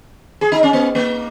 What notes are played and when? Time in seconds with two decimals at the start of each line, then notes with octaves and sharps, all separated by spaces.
0.41 G#4
0.52 D#4
0.63 C#4
0.73 B3
0.95 A#3